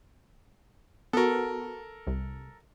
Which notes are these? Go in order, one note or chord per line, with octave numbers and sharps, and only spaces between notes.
B3 F#4 A4 A#4
C2